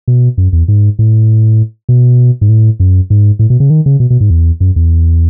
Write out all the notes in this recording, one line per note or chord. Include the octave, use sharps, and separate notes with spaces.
B2
F#2
E2
G#2
A2
B2
G#2
A2
F#2
G#2
A2
B2
C#3
D#3
C#3
B2
B2
G#2
E2
F#2
E2